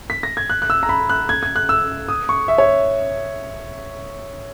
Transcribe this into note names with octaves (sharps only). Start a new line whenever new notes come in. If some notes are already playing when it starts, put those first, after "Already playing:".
B6
A#6
G#6
F#6
F#6
E6
A#5
B5
F#6
G#6
G#6
F#6
E6
D#6
C#6
E5
C#5